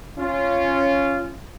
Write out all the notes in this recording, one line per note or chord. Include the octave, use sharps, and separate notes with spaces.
C#4 F4